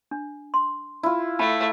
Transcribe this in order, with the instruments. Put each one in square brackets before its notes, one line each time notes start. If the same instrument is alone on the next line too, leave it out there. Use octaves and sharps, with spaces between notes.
[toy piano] D4
C6
[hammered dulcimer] E4 F4
[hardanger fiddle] A3 [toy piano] G5 A5 B5